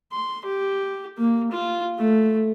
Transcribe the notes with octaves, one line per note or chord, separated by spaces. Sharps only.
C6
G4
A#3
F4
A3